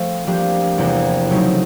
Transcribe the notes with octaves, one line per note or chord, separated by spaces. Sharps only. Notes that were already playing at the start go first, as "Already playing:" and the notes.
Already playing: F3 A3 C4
F3 A#3 D4 G4
E2 C3 F3 A#3
C#3 F#3 A3 C4 D#4